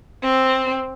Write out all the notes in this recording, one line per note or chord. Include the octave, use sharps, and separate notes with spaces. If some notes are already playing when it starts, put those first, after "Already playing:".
C4